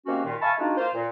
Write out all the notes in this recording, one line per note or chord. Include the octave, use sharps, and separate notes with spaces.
C3 D#3 A#3 C#4 F#4
D#2 A#2 D#3
E5 F5 G#5 A5 B5 C#6
G#3 A#3 D4 D#4 F4 F#4
A#3 F4 C5
A#2